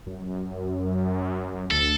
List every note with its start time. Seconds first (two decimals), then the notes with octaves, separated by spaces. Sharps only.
0.07 F#2
1.71 D2 A4